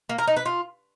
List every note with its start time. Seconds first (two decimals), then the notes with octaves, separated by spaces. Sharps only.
0.09 A#3
0.18 A#4
0.27 D#4
0.37 B4
0.46 F4